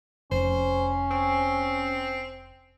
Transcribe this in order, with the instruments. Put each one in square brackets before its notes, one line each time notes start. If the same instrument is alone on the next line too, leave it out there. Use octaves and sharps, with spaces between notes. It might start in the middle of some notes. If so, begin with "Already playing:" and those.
[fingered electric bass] F1 [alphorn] C#4 [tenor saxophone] C5
[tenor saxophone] C4